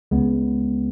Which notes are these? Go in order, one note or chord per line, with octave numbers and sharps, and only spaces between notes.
C#2 C#3 G#3 B3